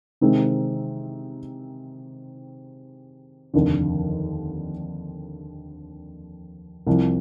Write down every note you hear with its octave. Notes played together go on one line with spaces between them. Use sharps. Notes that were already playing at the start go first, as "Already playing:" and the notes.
C3 D#3 G#3 C4 D#4
F1 D#2 D3
C2 C3 F3